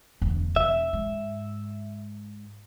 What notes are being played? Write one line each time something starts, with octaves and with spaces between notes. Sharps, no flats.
E1 D2
E1 E5
G#2